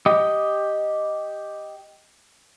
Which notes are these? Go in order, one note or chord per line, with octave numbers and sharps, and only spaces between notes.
G4 D#5